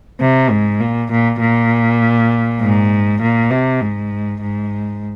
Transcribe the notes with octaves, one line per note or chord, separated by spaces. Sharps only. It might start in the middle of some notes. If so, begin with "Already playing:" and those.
C3
G#2
A#2
A#2
A#2
G#2
A#2
C3
G#2
G#2